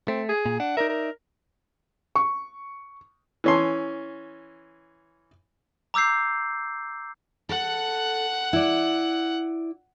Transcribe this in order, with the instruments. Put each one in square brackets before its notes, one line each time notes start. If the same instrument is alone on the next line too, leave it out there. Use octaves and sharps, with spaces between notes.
[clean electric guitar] A3 [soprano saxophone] C4
[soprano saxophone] G#4
[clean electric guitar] A#2
[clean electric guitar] D4 [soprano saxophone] F#5
[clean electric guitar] D#4 D5 E5 [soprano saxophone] A#4
[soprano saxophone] A#4
[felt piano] C#6
[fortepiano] E3 C#4 C6
[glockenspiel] A#5 D6 E6 G6 C7
[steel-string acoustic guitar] A4 [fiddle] F#5 F#6
[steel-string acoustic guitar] E4 D5